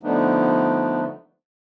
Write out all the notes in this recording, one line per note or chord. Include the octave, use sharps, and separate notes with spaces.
D3 F3 A3 B3 D4 D#4